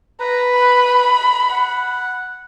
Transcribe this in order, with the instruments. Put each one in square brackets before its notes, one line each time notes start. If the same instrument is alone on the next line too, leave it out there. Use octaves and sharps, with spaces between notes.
[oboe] B4 [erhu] A#5
[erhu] B5
[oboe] F#5